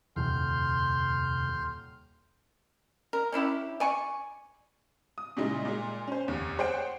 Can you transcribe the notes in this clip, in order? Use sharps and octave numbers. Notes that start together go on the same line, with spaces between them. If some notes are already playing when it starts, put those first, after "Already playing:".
D#1 F2 C3 C6 F6 G6
A#4
C#4 D4 E4 G4
D5 G#5 C#6
D#6
A#2 C#3 G3 G#3 D#4 E4
A#2 G#3
C#4 C5
F1 D#2
G#4 C5 C#5 F#5 G5